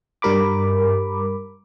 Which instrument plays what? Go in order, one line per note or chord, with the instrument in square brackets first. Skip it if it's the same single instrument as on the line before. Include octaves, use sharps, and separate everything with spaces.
[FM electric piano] G2 G3 A#4 B5 D6